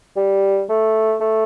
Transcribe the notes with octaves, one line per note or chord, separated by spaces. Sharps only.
G3
A3
A3